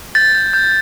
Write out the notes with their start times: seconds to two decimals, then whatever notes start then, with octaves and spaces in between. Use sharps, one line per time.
0.15 G6 A6
0.35 G6
0.53 G6